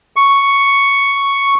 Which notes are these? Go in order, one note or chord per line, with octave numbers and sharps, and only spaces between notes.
C#6